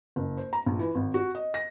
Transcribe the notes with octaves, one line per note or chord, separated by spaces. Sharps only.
F#1
C5
A#5
A#1
E3
G#1
F#4
D#5
A#6